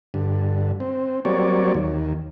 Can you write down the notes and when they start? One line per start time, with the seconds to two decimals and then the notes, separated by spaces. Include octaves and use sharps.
0.14 G2 D3
0.80 C4
1.25 F#3 G3 A#3 C4 C#5 D5
1.74 D#2